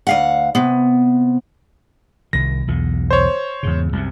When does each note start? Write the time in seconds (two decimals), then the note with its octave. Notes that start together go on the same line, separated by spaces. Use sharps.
0.07 D2 F5 F#5
0.55 C3 B3
2.33 C2 D#3 A#6
2.67 B1 E2 D3
3.11 C5 C#5
3.63 E2 G#2 C#3
3.93 C2 F#2 C3